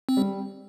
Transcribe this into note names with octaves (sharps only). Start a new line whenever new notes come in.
C4
G3